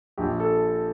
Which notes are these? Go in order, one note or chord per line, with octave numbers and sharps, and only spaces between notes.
A#1 G4
A4